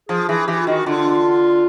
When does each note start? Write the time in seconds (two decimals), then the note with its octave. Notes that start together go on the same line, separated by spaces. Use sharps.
0.09 F3 G#4
0.28 E3 G#4
0.47 E3 G4
0.60 F4
0.67 D#3 F#4
0.86 D3 F4